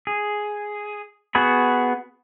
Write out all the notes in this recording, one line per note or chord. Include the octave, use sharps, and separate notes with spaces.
G#4
B3 F#4 G#4 B5